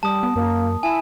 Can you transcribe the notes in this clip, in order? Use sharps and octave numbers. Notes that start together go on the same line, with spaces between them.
G3 A5 D#6
B3
F#2 A#3
E4 G#5 A5 E7